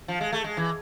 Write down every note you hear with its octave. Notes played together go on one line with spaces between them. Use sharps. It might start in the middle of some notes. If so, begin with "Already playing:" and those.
F3
G#3
A3
G#3
E3